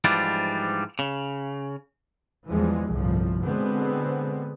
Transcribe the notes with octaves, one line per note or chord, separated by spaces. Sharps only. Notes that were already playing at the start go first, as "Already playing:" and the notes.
G#2 E3 F3 G3 D4
C#3
E2 E3 F3 G3 G#3
G1 C2 A2 F3
B2 D3 G#3 B3 C4